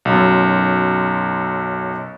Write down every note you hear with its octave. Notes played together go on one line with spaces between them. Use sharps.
B1 F#2